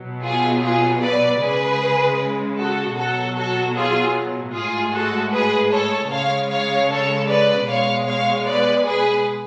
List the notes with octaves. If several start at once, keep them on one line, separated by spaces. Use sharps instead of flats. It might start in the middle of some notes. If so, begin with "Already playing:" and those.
Already playing: B2 F#3
F4 G#4
F4 G#4
B4 D5
C#3 G#3 G#4 B4
F#4 A4
B2 F#3 F#4 A4
F#4 A4
F4 G#4
A2 G#3 F4 G#4
F#4 A4
G#4 B4
A4 C#5
C#3 G#3 C#5 F5
C#5 F5
A4 C#5
B4 D5
B2 G#3 C#5 F5
C#5 F5
B4 D5
G#4 B4